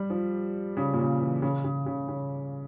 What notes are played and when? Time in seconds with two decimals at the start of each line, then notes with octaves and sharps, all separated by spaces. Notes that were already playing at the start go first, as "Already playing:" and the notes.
Already playing: G3
0.10 F3
0.77 C#3
0.93 A#2
0.99 C#3
1.21 E3
1.42 C#3
1.64 C#3
1.86 C#3
2.08 C#3